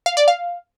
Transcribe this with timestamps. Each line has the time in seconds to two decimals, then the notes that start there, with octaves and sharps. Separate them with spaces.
0.06 F5
0.17 D5
0.28 F5